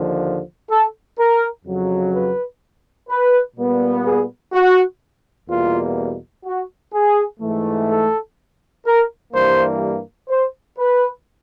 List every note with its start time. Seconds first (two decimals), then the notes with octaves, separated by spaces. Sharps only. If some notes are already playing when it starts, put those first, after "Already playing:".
Already playing: D#2 D3 F3
0.69 A4
1.17 A#4
1.64 F2 C#3 F#3
2.13 B4
3.09 B4
3.57 A#2 G3 B3
4.05 G#4
4.52 F#4
5.49 E2 B2 G3 A#3 F4
6.45 F#4
6.93 G#4
7.40 G#2 E3 A3
7.89 A4
8.85 A#4
9.32 G2 E3 G3 A#3 C5
10.29 C5
10.77 B4